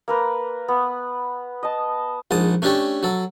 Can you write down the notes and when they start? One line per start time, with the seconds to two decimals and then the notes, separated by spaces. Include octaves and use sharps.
0.08 A#3 A#4 B4
0.68 B3
1.63 D#5 A5
2.31 A#1 G#2 A5 D#6
2.62 A3 C#4 D4 G4 A4
3.03 F#3 A4